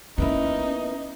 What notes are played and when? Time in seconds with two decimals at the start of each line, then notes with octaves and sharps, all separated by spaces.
0.18 A#3 B3 C#4 D#4 E4 A#4 B4